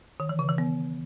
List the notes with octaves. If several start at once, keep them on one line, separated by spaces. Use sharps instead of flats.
D#3
E3
C#3
E3
B3